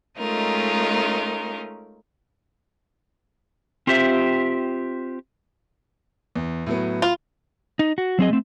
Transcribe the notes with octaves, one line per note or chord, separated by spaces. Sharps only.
G#3 A3 C#4 D#4 F4 A#4
C4 F4 G4 C5 E5
E2
A2 F#3 B3
F4
D#4
F#4
F#3 C4 G#4 D#5
A3 C4